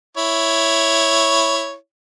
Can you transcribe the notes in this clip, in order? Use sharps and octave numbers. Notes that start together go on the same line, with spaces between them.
E4 C#5